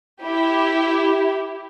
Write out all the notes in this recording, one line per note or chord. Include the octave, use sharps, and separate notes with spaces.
E4 G4